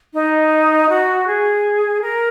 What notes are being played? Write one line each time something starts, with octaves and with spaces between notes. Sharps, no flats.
D#4
F#4
G#4
A#4